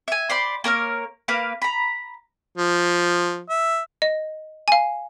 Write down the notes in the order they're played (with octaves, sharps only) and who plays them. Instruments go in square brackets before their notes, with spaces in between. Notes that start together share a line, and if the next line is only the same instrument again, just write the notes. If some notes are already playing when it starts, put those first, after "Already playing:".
[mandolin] E5 G#5
C5 D5 B5 C6
A#3 A#4 C#5 F6
A#3 B4 F5 F#6
A#5 B5
[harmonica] F3
E5
[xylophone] D#5
F5 G#5